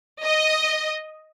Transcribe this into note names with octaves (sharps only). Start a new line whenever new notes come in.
D#5